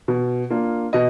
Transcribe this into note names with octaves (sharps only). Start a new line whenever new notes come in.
B2
A#3 D4 F4
B2 D#5